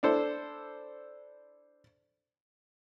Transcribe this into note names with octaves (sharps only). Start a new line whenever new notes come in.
D4 E4 A4 C5